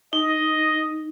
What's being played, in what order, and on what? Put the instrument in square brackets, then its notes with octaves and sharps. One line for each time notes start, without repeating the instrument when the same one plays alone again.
[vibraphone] D#4 [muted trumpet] D#5